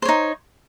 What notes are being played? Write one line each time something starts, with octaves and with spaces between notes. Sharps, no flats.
D#4 C5 C#5